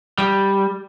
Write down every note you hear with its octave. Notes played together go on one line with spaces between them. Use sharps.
G3